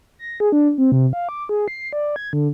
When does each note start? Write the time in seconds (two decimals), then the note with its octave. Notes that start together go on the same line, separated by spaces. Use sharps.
0.19 A#6
0.40 G#4
0.52 D4
0.78 C4
0.92 C3
1.13 F5
1.29 D6
1.49 G#4
1.68 C7
1.93 D5
2.16 G#6
2.33 D3